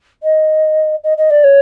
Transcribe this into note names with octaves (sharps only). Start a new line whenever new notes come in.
D#5
D#5
D#5
D5
C#5